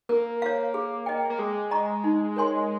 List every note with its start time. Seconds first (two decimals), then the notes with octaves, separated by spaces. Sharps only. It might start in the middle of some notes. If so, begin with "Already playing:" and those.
0.09 A#3 A#4
0.42 C#5 F5
0.74 G#4
1.06 D#5 G5
1.30 A#3
1.39 G#3 G#4
1.71 D#5 A#5 C#6
2.04 D#4
2.36 A#4 C#5 G#5 C6